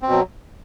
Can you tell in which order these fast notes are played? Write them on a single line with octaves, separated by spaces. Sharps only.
C4 B2 F#3